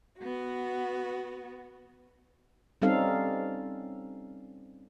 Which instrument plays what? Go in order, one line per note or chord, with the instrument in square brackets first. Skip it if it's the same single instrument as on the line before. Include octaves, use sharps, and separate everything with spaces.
[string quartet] B3 F#4
[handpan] G3 C4 C#4 D#4 A4 F5